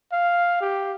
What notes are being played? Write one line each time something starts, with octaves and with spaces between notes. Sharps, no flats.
F5
G4